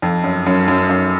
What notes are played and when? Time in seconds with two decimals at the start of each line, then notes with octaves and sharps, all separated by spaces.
0.02 F2
0.23 F#2
0.46 F#2
0.68 F#2
0.89 F#2